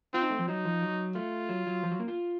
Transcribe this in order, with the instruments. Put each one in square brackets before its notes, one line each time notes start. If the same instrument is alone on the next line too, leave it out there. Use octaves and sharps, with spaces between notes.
[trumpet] C4 [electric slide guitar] F4
[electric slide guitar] D#4
A3
F3
[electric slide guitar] F#3 [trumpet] D#4
[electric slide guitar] F3
F#3
[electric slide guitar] A3 [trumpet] F4
[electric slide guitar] F#3
F#3
F3
F#3
A#3
F4